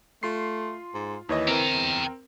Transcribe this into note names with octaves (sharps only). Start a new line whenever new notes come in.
A3 F4 C6 C7
G#2
D#2 E3 C#5 D#5
C4 A#4 G5 A#5
E2